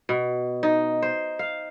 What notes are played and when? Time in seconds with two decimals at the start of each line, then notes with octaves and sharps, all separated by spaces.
0.09 B2
0.63 D#4
1.02 C5
1.39 F5